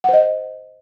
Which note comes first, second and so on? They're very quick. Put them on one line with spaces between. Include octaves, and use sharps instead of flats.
F#5 C5 D#5